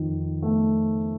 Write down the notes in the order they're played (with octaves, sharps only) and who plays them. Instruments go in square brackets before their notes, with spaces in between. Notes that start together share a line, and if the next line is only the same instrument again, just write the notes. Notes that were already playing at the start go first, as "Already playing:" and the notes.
Already playing: [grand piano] F2 D#3
A3